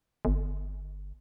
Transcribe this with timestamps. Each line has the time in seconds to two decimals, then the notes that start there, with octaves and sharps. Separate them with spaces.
0.25 G1